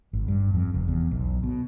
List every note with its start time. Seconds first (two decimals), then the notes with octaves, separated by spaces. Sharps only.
0.13 G#1
0.28 G2
0.54 F2
0.74 F1
0.88 E2
1.11 B1
1.43 B2